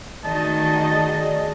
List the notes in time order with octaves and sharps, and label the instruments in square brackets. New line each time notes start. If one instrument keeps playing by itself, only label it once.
[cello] D#3 F#4 [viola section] A3 G#4 D#5 [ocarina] D5 [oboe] A5